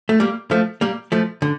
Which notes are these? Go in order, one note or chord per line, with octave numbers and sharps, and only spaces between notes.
A3
G3 A#3
F3 A3
G3 A#3
F3 A3
D3